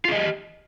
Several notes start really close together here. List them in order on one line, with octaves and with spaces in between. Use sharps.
F4 G#4 D#5 G4